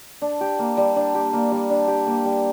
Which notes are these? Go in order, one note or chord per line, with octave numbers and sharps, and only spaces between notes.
D4
G4
A#3
G3
D4
G4
A#3
G3
D4
G4
A#3
G3